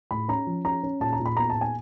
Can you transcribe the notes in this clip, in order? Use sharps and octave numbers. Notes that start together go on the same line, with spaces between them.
A2 B5
C#4 A#5
F3
C#4 A#5
C#4
A#2 A5
A#5
A#2
B5
B3 A#5
A5
A#2
G#5